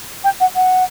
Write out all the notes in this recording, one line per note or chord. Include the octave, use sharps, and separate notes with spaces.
G5
F#5
F#5